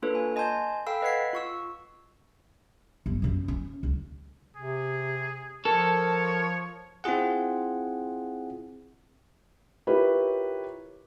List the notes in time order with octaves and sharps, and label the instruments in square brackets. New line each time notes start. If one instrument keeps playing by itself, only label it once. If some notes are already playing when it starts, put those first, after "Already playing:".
[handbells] A#3 D4 F4 A4 B4 C#5
G#5
D#5 G#5 A5 C6 G6
A4 F5 G5 B5 E6
B4 D#5 F#5 G#6 B6 C7
F4 C#6 E6
[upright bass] G1
F#2 C4
C#4
C#2
[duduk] C3 [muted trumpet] G#4
[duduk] F3 [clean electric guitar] A4 [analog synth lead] A#4 [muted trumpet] C#5
[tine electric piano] C4 E4 F4 G#4 F#5
[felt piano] E4 F4 G4 A#4 B4 C#5